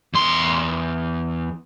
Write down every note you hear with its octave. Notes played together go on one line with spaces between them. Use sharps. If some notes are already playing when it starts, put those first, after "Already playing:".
E2 C6